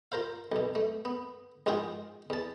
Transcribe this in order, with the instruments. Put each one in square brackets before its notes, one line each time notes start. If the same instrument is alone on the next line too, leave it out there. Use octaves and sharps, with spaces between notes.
[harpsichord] F4 A#4 C5 F5
B1 B2
A3
B3
A#1 G#2 F4 F#4 G#4 G5
E2 A5